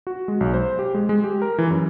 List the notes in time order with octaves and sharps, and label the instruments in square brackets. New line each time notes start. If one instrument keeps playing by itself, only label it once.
[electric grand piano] F#4
G#3
B1
C5
G4
G#3
G#3
G4
A#4
E3
F#2